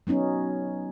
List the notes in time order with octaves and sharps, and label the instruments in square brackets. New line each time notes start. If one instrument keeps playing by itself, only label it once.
[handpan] F#3 B3 C#4 D#4